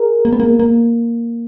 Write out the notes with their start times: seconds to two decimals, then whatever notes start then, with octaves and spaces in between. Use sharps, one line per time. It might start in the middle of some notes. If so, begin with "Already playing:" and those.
Already playing: G#4 A#4
0.25 A#3
0.33 B3
0.40 A#3
0.60 A#3